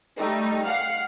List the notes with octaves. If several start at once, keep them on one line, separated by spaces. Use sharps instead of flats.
G3 A3 D#4
F5 F#5 C7